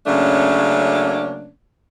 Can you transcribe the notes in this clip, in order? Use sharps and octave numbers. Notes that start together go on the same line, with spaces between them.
C#3 F#3 A3 A#3 C#4 D4